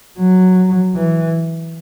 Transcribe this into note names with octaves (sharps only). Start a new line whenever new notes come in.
F#3
E3